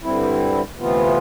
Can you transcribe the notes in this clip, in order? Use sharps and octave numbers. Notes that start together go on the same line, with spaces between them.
G2 D3 G3 C4 E4
D2 C3 E3 B3 F4